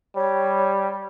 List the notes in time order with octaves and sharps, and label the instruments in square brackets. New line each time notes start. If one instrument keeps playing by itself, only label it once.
[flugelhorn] G3 [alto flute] C#5